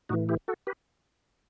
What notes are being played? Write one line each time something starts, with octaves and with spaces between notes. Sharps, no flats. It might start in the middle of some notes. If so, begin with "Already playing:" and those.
A2 E3 D#4 F#4
E4 G4
F#4 A4
G4 B4